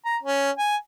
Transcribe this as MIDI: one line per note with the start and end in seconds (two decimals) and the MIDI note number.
0.05 0.17 82
0.23 0.51 61
0.58 0.77 80